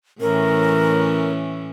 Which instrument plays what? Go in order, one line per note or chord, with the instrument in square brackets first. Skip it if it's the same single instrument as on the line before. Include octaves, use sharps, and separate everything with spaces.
[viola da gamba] A2 E3 C#4 [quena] A#4